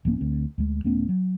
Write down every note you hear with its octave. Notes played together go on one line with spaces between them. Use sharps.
D1 F3 A#3 C#4
D2 C4
D2 G#3
D#1 A3 B3 C#4
F#3